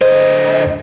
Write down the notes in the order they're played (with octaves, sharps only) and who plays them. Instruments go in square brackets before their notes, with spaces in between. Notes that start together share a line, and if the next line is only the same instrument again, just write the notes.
[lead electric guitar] D3 D#5 [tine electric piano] C5